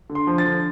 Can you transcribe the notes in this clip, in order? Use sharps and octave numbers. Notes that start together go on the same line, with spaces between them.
D3
C6
F3
A6
D3